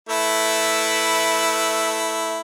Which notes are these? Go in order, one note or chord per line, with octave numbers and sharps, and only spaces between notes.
A3 E4 B4